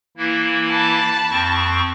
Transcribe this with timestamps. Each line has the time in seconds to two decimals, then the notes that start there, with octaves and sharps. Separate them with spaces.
0.17 E3 A#3 E4
0.70 A5 B5
1.30 F2 C4 C#6